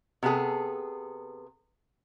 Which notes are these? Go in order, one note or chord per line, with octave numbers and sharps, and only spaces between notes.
C3 B3 E4 G#4 A4